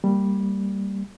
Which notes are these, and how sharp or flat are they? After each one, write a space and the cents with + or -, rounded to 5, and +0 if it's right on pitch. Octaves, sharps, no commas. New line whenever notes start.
G3 +0 A#3 -20